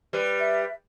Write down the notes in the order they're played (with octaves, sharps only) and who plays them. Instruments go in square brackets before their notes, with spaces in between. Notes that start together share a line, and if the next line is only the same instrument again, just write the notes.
[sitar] G3 B4
[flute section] E5